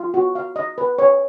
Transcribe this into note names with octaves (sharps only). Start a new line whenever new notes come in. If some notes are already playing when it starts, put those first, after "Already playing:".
Already playing: F4
F#4
F5
D#5
B4
C#5